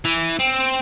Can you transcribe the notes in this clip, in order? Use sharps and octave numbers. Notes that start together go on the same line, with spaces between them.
E3
C4